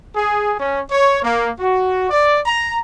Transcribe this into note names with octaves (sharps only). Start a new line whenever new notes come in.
G#4
C#4
C#5
A#3
F#4
D5
A#5